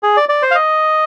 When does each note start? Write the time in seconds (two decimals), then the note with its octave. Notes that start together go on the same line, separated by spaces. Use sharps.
0.03 G#4
0.17 D5
0.29 D5
0.42 C5
0.51 F5
0.55 D#5